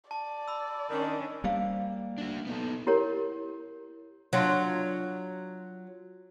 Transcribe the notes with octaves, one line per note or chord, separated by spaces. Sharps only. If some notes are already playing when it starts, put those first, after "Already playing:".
D5 A5
B5 E6
D#3 C#4 D4
G3 A#3 C5 F5
D4 F#4
B3 D#4 A4
E4 G4 A#4 C#5
F#3 D4 F4